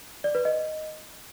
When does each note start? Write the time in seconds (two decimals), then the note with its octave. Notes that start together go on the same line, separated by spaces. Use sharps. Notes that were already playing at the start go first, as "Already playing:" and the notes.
0.24 D5
0.35 B4
0.45 D#5